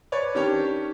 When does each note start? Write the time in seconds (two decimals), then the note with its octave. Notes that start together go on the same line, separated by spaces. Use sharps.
0.12 B4 C#5 D5
0.35 D#3 C#4 D4 G4 C#5